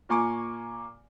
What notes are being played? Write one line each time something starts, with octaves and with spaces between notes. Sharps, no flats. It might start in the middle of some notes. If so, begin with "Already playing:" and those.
A#2 A#3 G#5 C#6 D6